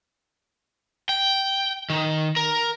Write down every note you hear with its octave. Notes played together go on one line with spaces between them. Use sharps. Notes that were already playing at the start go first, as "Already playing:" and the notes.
G5
D#3
A#4